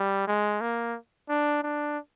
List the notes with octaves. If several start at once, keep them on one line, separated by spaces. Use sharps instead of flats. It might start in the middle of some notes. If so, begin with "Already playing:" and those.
Already playing: G3
G#3
A#3
D4
D4